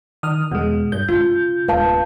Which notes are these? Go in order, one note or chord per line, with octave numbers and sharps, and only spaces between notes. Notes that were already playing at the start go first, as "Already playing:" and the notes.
D#3 D#6 F6
E2 B2 G#3
G2 G6
C#3 F4
D1 B3 B4 F5 A5